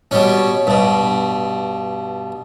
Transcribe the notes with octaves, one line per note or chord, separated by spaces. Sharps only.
B2 G3 C#4
G2 B2